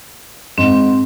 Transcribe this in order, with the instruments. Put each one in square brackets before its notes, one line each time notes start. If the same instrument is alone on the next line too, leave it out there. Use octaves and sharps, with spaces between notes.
[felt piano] G#2 [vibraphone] C4